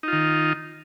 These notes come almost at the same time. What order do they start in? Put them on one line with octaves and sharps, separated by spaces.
D#4 F4 D#3